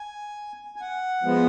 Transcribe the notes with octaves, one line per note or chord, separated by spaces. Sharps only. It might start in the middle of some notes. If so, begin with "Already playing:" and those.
Already playing: G#5
G#5
F#5
F3 G#3 B3